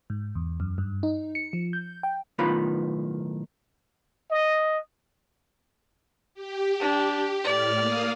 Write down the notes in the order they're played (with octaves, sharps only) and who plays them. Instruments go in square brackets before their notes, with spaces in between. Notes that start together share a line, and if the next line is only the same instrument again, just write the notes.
[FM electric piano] G#2
E2
F#2
G2
D#4
C#7
F3
G6
G5
[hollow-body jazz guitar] B1 A2 D#3 B3 F4 B5
[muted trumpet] D#5
[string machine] G4
[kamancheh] D4
[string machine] A2 F6 [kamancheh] D5
[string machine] A#3 F5 D#6